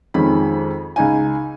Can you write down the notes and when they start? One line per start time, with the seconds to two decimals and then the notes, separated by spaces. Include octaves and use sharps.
0.14 F2 D#3 G#3 C#4 B5
0.96 C#2 D#4 G#5